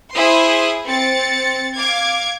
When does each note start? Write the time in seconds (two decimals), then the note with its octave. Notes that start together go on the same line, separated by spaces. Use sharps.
0.15 E4 G#4 C5 C6 D#6
0.86 C4 A6 C#7
1.77 F5 D6 G#6